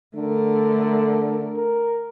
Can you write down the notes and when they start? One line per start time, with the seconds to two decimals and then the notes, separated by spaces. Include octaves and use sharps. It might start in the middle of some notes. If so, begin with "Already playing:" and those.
0.16 D3 A3 A#4
1.57 A#4